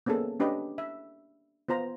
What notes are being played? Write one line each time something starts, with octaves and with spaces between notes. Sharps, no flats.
A#3 B3 C#4 G#4 A4
C#4 D4 G4 B4 D5 D#5
E5
B3 F4 C5 A#5